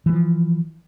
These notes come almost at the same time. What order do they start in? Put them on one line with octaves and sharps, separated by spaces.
E3 G3 F3